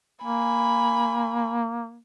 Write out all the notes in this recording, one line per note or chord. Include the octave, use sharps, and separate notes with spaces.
A#3 G#5 B5